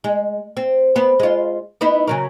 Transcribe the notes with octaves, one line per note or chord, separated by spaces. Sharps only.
G#3
C4
B3 C4
G#3 F4
B3 D#4 E4
C#3 F#3 A#4